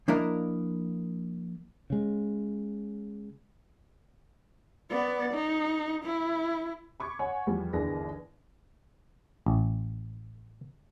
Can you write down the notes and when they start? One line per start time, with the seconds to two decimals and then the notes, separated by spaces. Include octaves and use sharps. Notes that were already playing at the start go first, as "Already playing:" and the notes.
0.08 F3 A#3 D4 E4 A#4 D#5
1.90 C#3 G#3
4.90 B3 D5
5.34 D#4
6.04 E4
7.00 B5 C#6 D6 G#6
7.19 C#5 F#5 G#5 C#6
7.47 E2 F3 G3
7.73 G1 D#2 E3 D4 G#4 A#6
9.46 A1